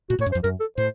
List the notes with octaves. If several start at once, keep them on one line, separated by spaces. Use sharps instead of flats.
A#2 F#4
A2 C#5
F#2
C5
F2
F#2 A#4
A4
A2 C5